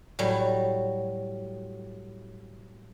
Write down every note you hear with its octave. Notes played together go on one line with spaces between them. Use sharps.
A2 F#3 G3